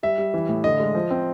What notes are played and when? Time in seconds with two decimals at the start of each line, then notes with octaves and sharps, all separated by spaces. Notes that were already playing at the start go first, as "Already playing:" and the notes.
0.03 G3 E5
0.18 G3
0.34 E3
0.49 A2
0.64 D3 D#5
0.80 G#3
0.95 F3
1.10 C4